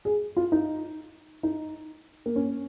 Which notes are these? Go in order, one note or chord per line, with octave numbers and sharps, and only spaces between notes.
G#4
F4
D#4
D#4
A#3
C#4